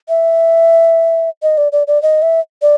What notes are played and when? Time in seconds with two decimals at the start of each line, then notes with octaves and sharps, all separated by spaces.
0.09 E5
1.43 D#5
1.58 D5
1.72 D5
1.87 D5
2.02 D#5
2.22 E5
2.62 D5